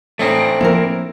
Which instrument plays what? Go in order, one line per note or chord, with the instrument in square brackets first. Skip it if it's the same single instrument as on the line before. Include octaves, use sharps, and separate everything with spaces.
[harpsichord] A2 E3 D#4 [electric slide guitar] A3 C4 D4
[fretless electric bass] F3 A#3 [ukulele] E4 A#4